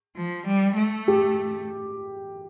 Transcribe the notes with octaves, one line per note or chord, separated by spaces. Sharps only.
F3
G3
A3
G4